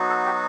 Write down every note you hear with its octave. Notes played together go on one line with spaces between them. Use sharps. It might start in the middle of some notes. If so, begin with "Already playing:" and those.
Already playing: F#3 B3 D#4 F#4
A4
G4